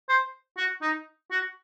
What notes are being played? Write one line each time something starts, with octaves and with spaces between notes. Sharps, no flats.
C5
F#4
D#4
F#4